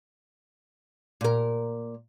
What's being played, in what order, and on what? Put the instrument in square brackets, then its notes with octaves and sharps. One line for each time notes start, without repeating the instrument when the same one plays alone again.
[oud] A#2 A#4